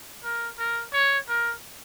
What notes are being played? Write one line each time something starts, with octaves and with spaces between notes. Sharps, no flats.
A#4
A#4
C#5
A#4